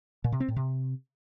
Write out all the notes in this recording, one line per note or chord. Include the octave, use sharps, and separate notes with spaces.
A#2
C3
C4
A2
C3